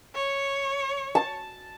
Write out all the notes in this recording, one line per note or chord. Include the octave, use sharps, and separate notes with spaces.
C#5
A5